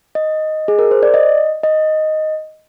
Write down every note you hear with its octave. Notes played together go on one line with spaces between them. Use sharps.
D#5
G#4
A#4
C5
D5
D#5
D#5